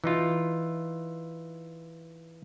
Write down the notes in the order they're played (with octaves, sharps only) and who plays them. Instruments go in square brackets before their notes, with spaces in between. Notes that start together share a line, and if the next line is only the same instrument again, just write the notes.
[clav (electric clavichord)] E3 D#4 F4